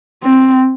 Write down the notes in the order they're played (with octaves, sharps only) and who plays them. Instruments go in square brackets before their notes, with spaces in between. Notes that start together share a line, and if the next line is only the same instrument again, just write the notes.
[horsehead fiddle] C4